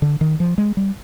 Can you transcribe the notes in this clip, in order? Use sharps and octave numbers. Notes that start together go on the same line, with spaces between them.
D3
D#3
F3
G#3
G3